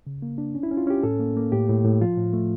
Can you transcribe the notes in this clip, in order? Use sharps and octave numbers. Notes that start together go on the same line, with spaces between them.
C#3
A#3
D4
C#4
E4
C#4
F4
C#4 G4
A2 A4
A#3
A#3
A2 G4
A2
A2
F3 F4
A2
A3